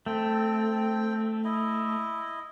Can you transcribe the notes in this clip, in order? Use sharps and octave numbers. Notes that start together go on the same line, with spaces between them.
A3 C4 G5
E4 D#5